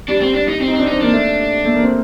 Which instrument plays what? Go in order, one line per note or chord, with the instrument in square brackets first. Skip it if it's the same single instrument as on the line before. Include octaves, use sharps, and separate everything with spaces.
[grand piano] G3 [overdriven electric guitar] D4
[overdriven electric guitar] C4
D4
D#4
C4
[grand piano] D#4
[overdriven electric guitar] C4
[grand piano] D4
[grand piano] C4 [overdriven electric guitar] D#4
[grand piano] A#3 [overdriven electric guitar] D4
[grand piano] A3
A3
A#3
C4